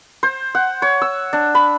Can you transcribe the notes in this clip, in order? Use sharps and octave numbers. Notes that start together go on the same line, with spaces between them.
C5
F#5
C#5
E6
D4
B5